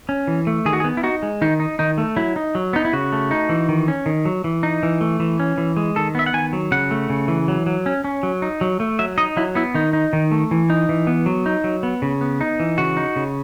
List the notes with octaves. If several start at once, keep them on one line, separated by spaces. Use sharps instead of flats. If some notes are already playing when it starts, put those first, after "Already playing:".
C#4
E3
A3
D#3 G#4
F#4
G#4
B3
E4
D#4 F#4
G#3
D#3 D#4
D#4
D#3 D#4
A3
F#3 E4
D#4
F#3
B3 D#4
E4
C#3 F#4
A3
D#4
E3
D#3
C#4
D#3
F#3
E3
D#4
E3
A3
E3
C#4
E3
G#3
D#3 A4
B3 E5
F#5
D#3 G#5
F#3
C#3 F#5
A3
C#3
E3
F#3
F#3
C#4
C#4
F#3
D#4
F#3
A3
F#3 E5
D#4 D#5
F#3 E4
B3 E4
D#3 D#4
D#4
D#3
A3
E3
D#4
E3
B3
F#3
D#4
F#3
B3
C#3
B3
D#4
E3
C#3 F#4
D#4
C#3